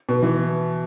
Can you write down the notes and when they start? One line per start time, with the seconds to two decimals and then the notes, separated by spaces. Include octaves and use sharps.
0.09 B2
0.23 E3